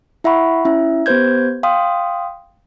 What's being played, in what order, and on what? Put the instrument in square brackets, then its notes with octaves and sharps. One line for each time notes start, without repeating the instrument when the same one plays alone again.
[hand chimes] E4 E5 F#5 B5 C#6
C#4 E4 E5
B3 G4 B4 C5 G6 G#6
F5 G5 C6 D#6